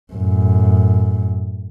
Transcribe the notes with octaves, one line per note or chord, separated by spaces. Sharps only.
F#2 A2